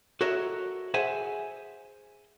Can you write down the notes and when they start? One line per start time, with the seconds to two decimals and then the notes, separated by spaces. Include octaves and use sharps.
0.21 F#4 A4 A#4 C#5 D#5 E5
0.94 G#4 C5 E5 F#5 G#5